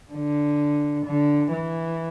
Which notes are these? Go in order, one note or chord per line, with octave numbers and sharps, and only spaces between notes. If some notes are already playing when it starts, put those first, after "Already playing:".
D3
D3
E3